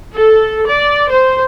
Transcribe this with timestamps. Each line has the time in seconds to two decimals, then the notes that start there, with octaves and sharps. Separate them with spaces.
0.14 A4
0.67 D5
1.10 C5